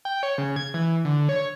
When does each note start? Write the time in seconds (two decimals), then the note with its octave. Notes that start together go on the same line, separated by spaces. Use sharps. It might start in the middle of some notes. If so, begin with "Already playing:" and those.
0.05 G5
0.23 C#5
0.38 C#3
0.56 G#6
0.74 E3
1.05 D3
1.29 C#5